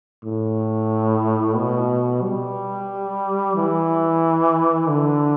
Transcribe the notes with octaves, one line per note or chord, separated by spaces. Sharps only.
A2
B2
G3
E3
D3